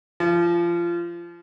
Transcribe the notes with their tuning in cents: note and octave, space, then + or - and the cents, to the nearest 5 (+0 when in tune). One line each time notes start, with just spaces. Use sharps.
F3 -25